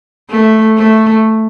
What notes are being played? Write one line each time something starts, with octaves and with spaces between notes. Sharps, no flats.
A3
A3